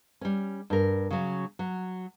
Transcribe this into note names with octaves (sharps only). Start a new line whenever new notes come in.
G3 C#4
G2 A#4
C#3 F#3
F#3